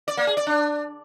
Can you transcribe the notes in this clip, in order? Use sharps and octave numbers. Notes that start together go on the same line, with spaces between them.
D5
A#3
G#4
D5
D4